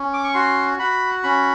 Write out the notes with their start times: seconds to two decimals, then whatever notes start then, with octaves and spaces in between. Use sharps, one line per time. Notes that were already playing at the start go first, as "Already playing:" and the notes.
Already playing: C#4
0.13 D6
0.24 C#6
0.34 F#4 C6
0.79 F#4 B5
1.24 C#4 B5